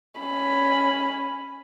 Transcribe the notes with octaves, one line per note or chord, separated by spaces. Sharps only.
C#4 B5